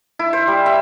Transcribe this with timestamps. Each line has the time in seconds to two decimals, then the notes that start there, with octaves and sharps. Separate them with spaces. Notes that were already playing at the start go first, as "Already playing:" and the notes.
0.19 E4
0.33 C5
0.47 G3
0.66 E5